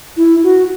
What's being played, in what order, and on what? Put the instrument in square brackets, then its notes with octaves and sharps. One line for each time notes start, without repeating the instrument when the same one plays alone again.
[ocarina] E4
F#4